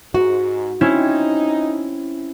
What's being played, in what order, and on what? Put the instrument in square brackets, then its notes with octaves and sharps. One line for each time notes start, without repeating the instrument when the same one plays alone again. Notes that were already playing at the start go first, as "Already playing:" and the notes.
[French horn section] G#2 [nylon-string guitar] F#4
[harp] C4 C#4 E4 [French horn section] D#4